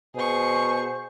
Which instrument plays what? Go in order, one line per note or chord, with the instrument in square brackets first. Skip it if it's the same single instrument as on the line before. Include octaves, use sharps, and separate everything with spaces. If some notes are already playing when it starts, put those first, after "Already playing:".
[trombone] B2 [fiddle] G#4 C#6 [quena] C5